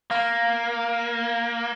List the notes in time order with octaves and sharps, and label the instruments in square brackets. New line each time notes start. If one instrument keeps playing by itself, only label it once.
[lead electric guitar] A#3 [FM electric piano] F5